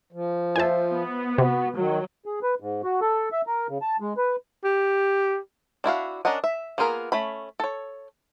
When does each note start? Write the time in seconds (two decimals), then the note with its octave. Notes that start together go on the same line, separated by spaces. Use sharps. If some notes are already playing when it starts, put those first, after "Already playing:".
0.12 F3
0.56 F4 C5 E5 G#5 A5
0.92 B3
1.38 C3 F#4
1.76 D#3 F#3
2.26 G#4
2.43 B4
2.60 G#2
2.84 F#4
3.01 A4
3.32 E5
3.47 A#4
3.68 C#3
3.82 A5
4.00 G#3
4.17 B4
4.64 G4
5.84 D4 E4 F#4 F5
6.25 C#4 D4 A#4 D#5 F#5
6.44 E5
6.78 A#3 B3 F4 G#4 A#4
7.12 A3 C#4 B5
7.60 A4 C#5